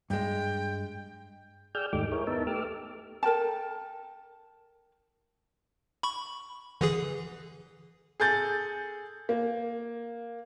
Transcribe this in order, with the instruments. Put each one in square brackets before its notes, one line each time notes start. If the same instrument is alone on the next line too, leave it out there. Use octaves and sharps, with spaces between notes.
[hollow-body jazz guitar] G2 G#3 [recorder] G5
[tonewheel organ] G#4 D5 G5 E6 F6 G6
D#2 G#2 A3 D#4 G4 D6
E4 G#4 A#4 C#5
B3 D#4 A#4 E5 A5
A3 G4 D6 E6 F6
[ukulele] A4 A#4 G5 A5
[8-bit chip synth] B5 C#6
D3 E3 G#4
[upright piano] G#4 A4 G6 A6
A#3